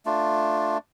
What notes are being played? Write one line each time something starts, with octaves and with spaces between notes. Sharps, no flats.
A3 D4 F4